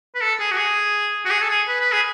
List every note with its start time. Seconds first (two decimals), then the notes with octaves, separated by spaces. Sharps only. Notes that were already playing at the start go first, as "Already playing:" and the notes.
0.15 B4
0.21 A4
0.39 G#4
0.51 F#4
0.57 G#4
1.25 F#4
1.31 G#4
1.42 A4
1.49 G#4
1.68 B4
1.80 B4
1.92 G#4